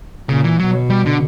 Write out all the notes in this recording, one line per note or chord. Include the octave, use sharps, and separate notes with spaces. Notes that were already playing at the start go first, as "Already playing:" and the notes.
A#2 C#3
E3
B2 F#3
G3
D3